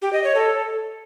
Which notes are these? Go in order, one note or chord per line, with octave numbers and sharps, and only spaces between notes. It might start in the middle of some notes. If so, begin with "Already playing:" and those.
G4
D#5
C#5
A4